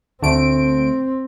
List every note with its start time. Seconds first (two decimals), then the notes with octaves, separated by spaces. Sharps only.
0.22 D2 A3 C4 D7